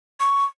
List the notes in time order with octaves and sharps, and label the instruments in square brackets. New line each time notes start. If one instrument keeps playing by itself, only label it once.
[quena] C#6